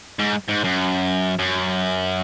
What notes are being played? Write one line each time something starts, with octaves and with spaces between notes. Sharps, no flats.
G#2
G#2
F#2
F#2